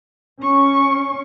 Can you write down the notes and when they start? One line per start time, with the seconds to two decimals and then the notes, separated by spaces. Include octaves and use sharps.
0.42 C#4 C#6